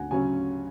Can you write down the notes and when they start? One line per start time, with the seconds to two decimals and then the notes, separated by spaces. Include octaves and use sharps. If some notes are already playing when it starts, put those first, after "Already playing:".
Already playing: D2 F#5 G#5
0.11 C#3 F#3 C#4 G#5